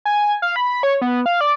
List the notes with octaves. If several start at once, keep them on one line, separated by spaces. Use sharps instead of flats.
G#5
F5
B5
C#5
B3
F5
D5